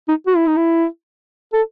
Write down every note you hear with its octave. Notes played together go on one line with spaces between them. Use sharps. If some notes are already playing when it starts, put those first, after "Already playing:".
D#4
F#4
E4
D#4
E4
A4